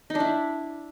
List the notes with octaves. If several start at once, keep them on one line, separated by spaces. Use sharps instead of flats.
D#4
D4
E4